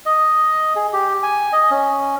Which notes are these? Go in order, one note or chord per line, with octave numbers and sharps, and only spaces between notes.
D#5
G#4
G4
G#5
D#5
C#4